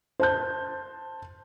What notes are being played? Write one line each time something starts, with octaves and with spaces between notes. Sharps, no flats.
C5 A5 G6